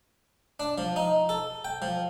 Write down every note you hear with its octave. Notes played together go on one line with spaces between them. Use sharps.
D4
F3
D#4
A4
G5
F3